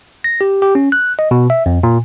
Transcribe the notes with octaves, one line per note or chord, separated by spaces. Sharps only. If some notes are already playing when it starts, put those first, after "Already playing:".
A#6
G4
G4
C#4
F#6
D#5
B2
E5
F2
A#2